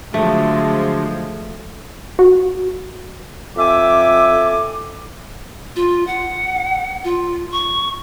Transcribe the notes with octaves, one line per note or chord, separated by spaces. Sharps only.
D3 F3 F#3 G#3 A3
F#4
F2 A4 E5 G5 G#5 D6
F4
F#5
F4
C#6